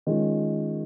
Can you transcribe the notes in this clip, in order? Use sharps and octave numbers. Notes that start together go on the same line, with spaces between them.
D#3 G#3 C#4 F4